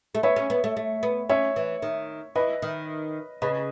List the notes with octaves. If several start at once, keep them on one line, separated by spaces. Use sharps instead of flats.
A3
B3 C#5 E5
C#4
B3
A3
A3
B3
C#4 C#5 E5
E3
D#3
E3 B4 D#5
D#3
C#3 B4 D#5